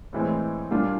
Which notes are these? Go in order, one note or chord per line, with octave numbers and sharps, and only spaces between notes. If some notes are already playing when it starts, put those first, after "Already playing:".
A2 E3 G#3 C4
A#2 G3 A#3 D4 F4